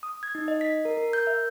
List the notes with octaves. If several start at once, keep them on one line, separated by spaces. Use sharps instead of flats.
D#6
G#6
D#4
D#5
B6
A#4
A#4
G6
E5